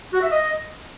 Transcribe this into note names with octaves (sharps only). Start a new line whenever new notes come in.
F#4
E5
D#5